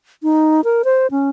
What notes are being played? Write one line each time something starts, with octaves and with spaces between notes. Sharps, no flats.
D#4
A#4
C5
C#4